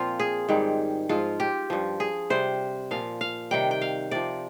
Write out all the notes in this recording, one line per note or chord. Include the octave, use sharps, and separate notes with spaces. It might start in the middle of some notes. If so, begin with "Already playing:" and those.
Already playing: A#2 F3 C4 F4
G#4
G#2 D#3 G3
G#2 F3 F4
G4
G2 F3
G#4
C3 G3 C5
A#2 F3 F5
F5
C3 D#3 G3 G5
G5
F5
C3 F3 D5